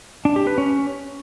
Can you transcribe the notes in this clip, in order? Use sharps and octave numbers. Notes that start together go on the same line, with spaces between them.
D4
G4
B4
C#4